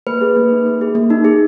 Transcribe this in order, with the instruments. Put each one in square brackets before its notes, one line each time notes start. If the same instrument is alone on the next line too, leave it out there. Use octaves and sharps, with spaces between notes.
[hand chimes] A#3 B4
G#4
A#3
D#4
A#3
G#4
A#3
D#4
G#4